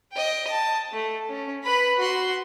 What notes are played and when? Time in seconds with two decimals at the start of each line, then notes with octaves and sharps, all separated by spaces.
0.12 D#5 G5
0.50 A5
0.93 A3
1.29 C#4
1.64 B4 B5
1.99 F#4 C6